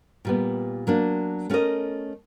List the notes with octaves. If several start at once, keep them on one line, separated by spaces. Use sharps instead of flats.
A#2 G3 B3
F#3 A#3 D4
A3 C#4 F#4 A#4 D#5